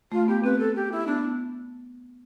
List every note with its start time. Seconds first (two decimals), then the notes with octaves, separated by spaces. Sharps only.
0.12 A3 F4
0.28 B3 G4
0.44 C4 B4
0.59 A4
0.76 G4
0.92 E4
1.07 B3 D4